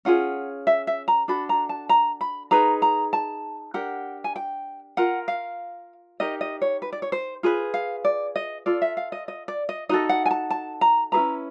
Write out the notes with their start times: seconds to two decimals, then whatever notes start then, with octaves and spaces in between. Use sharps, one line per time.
0.05 C#4 F4 G#4 F#5
0.67 E5
0.87 E5
1.08 A#5
1.28 D4 F#4 A4 B5
1.49 A#5
1.69 A5
1.89 A#5
2.21 B5
2.51 D#4 G#4 B4 A#5
2.82 A#5
3.13 A5
3.74 D4 G4 A#4 F#5
4.24 G#5
4.36 G5
4.97 F4 A#4 F#5
5.28 F5
6.20 D#4 G4 A#4 D#5
6.41 D#5
6.62 C#5
6.82 B4
6.93 D5
7.02 C#5
7.12 C5
7.43 F4 G#4 B4
7.74 F5
8.05 D5
8.36 D#5
8.66 F4 A4 D5
8.82 E5
8.97 F5
9.12 D#5
9.28 D#5
9.48 D5
9.69 D#5
9.89 D#4 F#4 A4 D#5
10.09 F#5
10.26 G#5
10.31 A5
10.50 A5
10.81 A#5
11.12 C#4 E4 G#4 B4 A#5